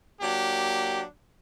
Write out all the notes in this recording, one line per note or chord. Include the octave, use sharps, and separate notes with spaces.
F#3 A#3 D4 G4